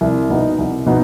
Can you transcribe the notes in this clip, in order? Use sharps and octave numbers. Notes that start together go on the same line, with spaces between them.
C2
B2 B3 D#4
C2
B2 B3 D#4